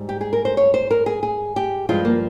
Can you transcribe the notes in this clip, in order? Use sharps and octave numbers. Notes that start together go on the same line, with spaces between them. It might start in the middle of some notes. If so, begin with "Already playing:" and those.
Already playing: G#2 G3
G4
G#4
A#4
C5
C#5
C5
A#4
G#4
G#4
G4
G2 F3 G#3 F4
A#3